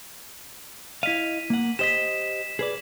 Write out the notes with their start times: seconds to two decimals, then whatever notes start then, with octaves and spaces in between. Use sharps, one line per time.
1.03 E4 D#5 F5 B6 D#7
1.50 A#3 F#5
1.79 G4 C5 D#5 B6 E7
2.59 G#4 B4 D5